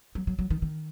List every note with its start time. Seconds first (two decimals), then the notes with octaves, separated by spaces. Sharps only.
0.15 F#3
0.27 F#3
0.39 F#3
0.50 D#3
0.62 D#3